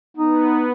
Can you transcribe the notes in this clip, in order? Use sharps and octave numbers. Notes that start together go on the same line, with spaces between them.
B3 D#4